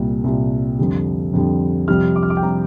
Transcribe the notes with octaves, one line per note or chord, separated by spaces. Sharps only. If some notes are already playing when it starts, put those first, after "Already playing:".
Already playing: C2 A#2 G3
C2 A#2 G3
F2 D3 G3
F2 D3 G3
F2 C3 G3 F6
D6
F6
D6
G5
C3 G3 A#5